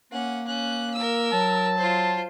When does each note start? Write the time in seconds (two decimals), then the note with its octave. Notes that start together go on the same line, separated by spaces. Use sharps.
0.11 A#3 C#4 F#5
0.47 C#4 F#6
0.94 A#4 E6
1.33 F#3 A5
1.77 F4 C5